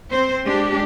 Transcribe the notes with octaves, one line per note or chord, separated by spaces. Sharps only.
C4 C5
G#3 D4 G4